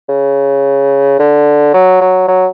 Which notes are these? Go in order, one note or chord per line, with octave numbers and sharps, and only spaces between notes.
C#3
D3
F#3
F#3
F#3